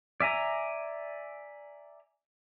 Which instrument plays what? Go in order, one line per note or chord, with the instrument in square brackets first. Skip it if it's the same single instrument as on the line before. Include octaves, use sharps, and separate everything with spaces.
[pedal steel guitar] D5 E5 G#5 A#5